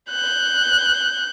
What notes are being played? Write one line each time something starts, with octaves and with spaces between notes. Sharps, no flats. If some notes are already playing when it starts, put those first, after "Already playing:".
F#6 G6